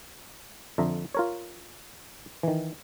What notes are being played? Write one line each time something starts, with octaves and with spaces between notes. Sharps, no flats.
F2 D3 E5 A#5
F4 A#4 C#5
D#3 E3